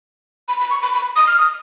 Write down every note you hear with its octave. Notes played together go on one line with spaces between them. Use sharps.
B5
B5
C#6
B5
B5
D#6
F6
D#6